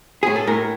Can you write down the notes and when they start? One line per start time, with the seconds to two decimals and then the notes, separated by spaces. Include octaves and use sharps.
0.23 A2 G#4
0.36 A4
0.47 A2 A#4